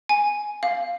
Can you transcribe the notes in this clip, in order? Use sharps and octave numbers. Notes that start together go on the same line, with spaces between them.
G#5
F5